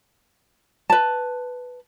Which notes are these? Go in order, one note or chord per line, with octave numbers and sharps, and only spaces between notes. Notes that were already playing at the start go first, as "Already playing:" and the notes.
B4 A5